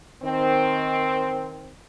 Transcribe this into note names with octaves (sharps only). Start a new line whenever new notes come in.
D#3 C4